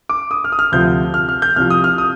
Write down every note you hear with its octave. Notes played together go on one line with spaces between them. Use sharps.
D6
D#6
F6
D#6
F6
D2 C3 F3 G6
F6
F6
G6
C2 C3 F3 F6
D#6
F6
D#6